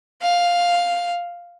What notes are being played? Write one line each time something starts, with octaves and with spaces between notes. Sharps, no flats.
F5